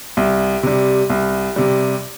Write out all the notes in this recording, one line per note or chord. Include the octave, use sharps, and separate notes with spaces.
C2
C3 G3
C2
C3 G3